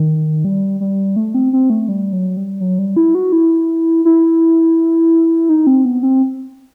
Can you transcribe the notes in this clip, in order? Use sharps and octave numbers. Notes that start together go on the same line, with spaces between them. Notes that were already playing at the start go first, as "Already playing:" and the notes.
Already playing: D#3
G3
G3
A3
C4
C4
A3
G3
F#3
G3
F#3
G3
E4
F#4
E4
E4
D#4
C4
B3
C4